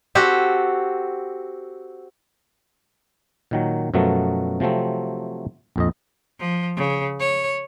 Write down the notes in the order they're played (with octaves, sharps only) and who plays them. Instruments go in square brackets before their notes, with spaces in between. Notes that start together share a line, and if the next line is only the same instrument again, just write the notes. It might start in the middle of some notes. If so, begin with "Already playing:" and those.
[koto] C4 F#4 G4 A4
[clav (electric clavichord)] A#2 D#3 F#3
F#2 B2 F3 F#3 A3
C3 F3 F#3 A3 C4
A#1 F2 D#5
[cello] F3
C#3
C#5